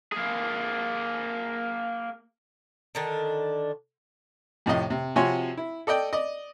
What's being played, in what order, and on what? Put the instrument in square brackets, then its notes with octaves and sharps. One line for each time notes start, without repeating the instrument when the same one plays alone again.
[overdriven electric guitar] A#3 G#4
[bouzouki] D3 D#3 D4
[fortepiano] F2 A2 C3 D#5
C3
C3 F3 F#4 C#5 G#5 C6
E4
A4 D5 D#5 G5
D5 D#5